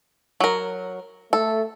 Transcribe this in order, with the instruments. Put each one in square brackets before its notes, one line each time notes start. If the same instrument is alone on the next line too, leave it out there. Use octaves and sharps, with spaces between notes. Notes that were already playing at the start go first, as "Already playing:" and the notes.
[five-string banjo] F#3 A#4
[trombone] A3 [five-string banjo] A4